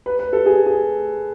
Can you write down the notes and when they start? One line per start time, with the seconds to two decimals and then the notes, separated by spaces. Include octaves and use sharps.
0.06 B4
0.19 B4
0.33 A4
0.46 G#4
0.66 G#4